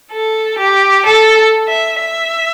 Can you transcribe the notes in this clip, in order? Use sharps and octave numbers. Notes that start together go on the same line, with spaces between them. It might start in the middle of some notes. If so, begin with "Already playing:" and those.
A4
G4
A4
E5
E5